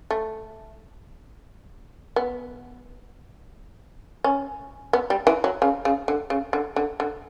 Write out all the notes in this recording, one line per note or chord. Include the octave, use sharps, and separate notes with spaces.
A3
B3
C#4
B3
G3
E3
F#3
C#3
C#3
D3
C#3
D3
D3
D3